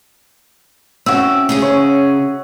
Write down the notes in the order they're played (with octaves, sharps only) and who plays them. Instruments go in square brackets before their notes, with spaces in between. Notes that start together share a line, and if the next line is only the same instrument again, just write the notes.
[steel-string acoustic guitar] C4 C#4 [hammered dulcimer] F#4 E5
[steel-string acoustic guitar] C#3 C#4 G#4
[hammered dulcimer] C#5